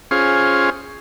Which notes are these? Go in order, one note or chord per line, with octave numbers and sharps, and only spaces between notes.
C#4 F4 G#4 C5